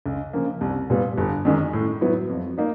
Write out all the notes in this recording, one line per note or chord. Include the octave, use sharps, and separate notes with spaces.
C#2
C#3 F3 A#3
C2
A#2 G3 B3
G1
F#2 D#3 G#3 C#4
A2
F#3 B3 E4
F2
A#3 D#4